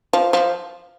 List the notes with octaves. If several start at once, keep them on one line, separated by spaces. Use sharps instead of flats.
F3
F3